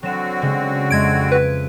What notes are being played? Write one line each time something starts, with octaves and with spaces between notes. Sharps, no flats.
D3 F#3 C4 F#4 E7
C#3 G#3
F2 G#3 E5 G#6 D7
B4